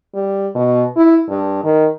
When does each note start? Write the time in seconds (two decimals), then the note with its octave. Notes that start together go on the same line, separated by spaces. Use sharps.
0.14 G3
0.55 B2
0.97 E4
1.29 G2
1.64 D#3